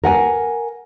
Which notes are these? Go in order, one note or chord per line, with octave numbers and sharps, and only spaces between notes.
A#4 F#5 G#5